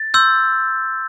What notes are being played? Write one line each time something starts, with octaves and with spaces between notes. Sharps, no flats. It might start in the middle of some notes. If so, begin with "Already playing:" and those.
Already playing: A6
C6 E6 G6